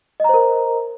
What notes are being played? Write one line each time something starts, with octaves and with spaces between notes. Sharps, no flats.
A#4 C5 D#5 A#5